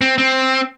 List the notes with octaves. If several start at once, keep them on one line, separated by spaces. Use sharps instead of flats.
C4
C4